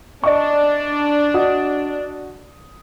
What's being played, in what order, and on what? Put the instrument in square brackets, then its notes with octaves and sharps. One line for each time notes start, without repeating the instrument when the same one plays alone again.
[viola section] D4 [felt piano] D5 D#5 C#6
[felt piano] F#4 D#5 D#6